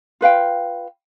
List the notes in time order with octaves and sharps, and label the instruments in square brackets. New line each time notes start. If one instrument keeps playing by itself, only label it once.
[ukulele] F4 B4 F5 G5